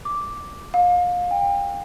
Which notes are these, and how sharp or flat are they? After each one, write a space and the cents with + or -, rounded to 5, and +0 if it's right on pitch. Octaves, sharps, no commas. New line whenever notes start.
D6 -5
F5 +30
G5 +35